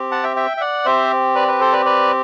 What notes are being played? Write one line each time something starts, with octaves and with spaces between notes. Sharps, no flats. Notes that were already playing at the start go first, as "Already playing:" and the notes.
Already playing: C4 G4
F#5 A5
E5 G5
E5 G5
E5
D5 F#5
C4 G4 C5 E5
B4 D5
B4
A4 C5
B4 D5
B4 D5